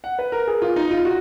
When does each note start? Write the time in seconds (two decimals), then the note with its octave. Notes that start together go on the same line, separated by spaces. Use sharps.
0.04 F#5
0.19 B4
0.32 A#4
0.47 G#4
0.62 F4
0.76 D#4
0.91 F4
1.05 F#4